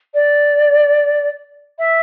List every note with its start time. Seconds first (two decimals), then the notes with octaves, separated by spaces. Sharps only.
0.14 D5
1.79 E5